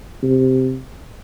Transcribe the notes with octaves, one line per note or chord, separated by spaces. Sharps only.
C3